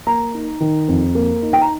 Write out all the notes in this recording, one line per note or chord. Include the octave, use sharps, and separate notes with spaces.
A#3 A#5
D#4
D#3
F2
A#3
D#4
G5
A#5